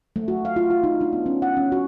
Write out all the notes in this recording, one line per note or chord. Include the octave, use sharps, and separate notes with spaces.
A3
F#4
F5
F4
F4
D#4
D4
B3
C#4
F#5
C#4
F#4